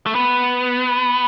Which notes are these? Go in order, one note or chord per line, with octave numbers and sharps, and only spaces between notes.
A3
B3